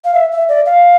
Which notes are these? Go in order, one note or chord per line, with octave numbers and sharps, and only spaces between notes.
F5
E5
E5
D5
F5